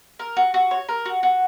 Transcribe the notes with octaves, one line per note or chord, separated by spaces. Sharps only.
A#4
F#4
F#4
C#5
A#4
F#4
F#4